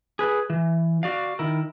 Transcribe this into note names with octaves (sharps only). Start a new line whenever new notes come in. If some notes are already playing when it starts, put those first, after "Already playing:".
G#4 B4
E3
F#4 D5 F5
D#3 E4 A#4